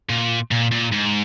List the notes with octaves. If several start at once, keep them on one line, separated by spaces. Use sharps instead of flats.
A#2
A#2
A#2
G#2